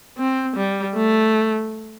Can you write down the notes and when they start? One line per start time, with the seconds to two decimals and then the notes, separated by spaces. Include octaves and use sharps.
0.18 C4
0.56 G3
0.96 A3